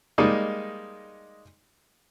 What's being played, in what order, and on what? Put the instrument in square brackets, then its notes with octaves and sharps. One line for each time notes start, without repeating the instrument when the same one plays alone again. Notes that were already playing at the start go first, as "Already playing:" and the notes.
[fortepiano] G3 G#3 A#3 D#4 D5 D#5